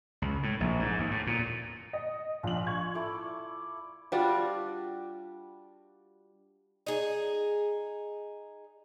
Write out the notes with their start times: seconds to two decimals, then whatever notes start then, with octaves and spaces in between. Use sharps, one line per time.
0.22 C#2
0.43 A2
0.60 A#1
0.79 G#2
0.98 D#2
1.11 A2
1.27 A#2
1.93 D#5
2.43 A#1 F4 F#7
2.67 C#6 G#6
2.95 E4 A4 D5
4.12 G3 D4 F4 F#4
6.86 D#4 G#4